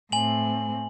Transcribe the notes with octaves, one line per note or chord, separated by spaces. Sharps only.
A2 C4 G#5 F#7